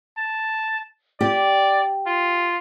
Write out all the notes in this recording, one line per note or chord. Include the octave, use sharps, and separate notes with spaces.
A5
G4 D5
F4